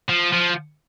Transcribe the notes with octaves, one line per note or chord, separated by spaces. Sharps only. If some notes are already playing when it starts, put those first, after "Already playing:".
F3
F3